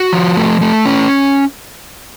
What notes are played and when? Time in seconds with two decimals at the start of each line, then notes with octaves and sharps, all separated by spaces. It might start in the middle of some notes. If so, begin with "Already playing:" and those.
Already playing: F#4
0.13 F3
0.37 A3
0.61 A3
0.86 C#4